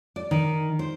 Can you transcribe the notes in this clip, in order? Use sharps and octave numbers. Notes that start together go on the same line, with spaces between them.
D5
D#3
C5